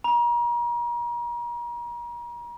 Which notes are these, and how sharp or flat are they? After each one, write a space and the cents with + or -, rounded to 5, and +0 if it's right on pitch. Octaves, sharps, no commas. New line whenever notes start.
A#5 +35